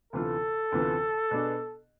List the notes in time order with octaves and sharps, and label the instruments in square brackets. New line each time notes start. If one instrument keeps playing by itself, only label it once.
[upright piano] D2 C3 E3 B3 F4 [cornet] A4
[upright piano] D2 C3 E3 B3 F4
B2 B3 D4 G#4